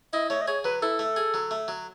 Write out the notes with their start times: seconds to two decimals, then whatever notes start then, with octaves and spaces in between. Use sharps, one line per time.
0.13 E4 D#5
0.30 A3 C#5
0.42 D#5
0.48 G#4 C#5
0.64 F#3 B4
0.82 E4 A4
0.99 A3
1.16 G#4
1.34 F#3
1.51 A3
1.68 F#3